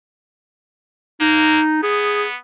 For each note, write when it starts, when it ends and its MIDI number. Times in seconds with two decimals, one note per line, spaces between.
1.21 1.60 58
1.21 1.81 63
1.83 2.37 59
1.83 2.25 68